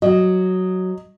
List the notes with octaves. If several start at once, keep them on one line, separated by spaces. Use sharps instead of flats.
F#3 D#5